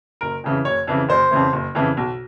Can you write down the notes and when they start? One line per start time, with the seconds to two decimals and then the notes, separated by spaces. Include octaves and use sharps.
0.21 F#1 A#4
0.44 F2 C#3 E3
0.65 F#1 C#5
0.87 F2 C#3 E3
1.09 F#1 C5
1.31 F2 C#3 E3
1.53 F#1
1.75 F2 C#3 E3
1.97 B1